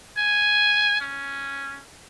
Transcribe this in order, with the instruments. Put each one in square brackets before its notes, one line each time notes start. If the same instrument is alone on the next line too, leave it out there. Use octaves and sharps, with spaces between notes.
[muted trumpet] G#5
C#4